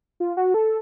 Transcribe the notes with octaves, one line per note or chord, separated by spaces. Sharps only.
F4
F#4
A4